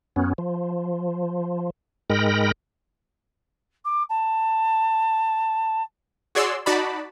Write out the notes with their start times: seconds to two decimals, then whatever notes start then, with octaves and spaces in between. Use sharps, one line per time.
0.16 F#2 B3 C#4
0.38 F3
2.10 G#2 G#3 A#4 G5 B5 A#6
3.85 D6
4.10 A5
6.35 F#4 G#4 C#5 D5 C6 E6
6.66 D#4 F#4 D5 A5 B5